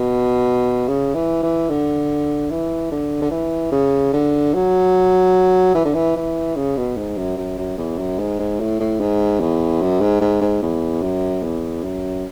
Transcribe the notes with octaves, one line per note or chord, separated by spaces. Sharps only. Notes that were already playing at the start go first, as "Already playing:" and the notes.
Already playing: B2
C#3
E3
E3
D3
E3
D3
D3
E3
C#3
D3
F#3
E3
D3
E3
E3
C#3
B2
G#2
F#2
F#2
F#2
E2
F#2
G#2
G#2
A2
A2
G#2
E2
F#2
G#2
G#2
G#2
E2
F#2
E2
F#2